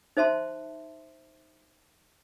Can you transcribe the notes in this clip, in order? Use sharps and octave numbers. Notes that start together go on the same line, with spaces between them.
D#4 C5 E5 A5 C6